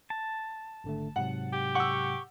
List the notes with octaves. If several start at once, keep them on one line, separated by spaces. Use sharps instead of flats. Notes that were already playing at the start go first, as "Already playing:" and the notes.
A5
G#1 D3 A3
G#2 C3 F#3 F#5
G4
F#5 C#6 E6